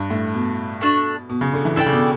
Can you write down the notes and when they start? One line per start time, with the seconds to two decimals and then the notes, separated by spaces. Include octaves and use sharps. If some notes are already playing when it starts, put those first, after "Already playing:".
Already playing: G2
0.10 A2
0.34 B2
0.81 A3 D4 F#4
1.29 B2
1.41 C#3
1.53 D3
1.65 E3
1.76 D3 E4 A4 D5 G5
1.86 C#3
1.92 B2